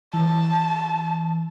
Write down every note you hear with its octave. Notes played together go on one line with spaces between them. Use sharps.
E3 A5